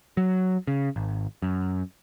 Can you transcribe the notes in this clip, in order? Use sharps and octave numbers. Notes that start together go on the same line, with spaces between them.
F#3
C#3
G#1
F#2